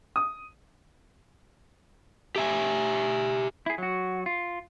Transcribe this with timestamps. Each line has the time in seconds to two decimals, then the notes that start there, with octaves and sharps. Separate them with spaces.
0.16 D#6
2.36 G4 E5 G#5
3.66 E4 G#4
3.78 F#3 F#4
4.26 F4